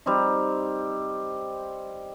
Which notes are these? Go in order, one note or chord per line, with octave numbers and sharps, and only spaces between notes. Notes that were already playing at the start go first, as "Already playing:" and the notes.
G3 C4 D#4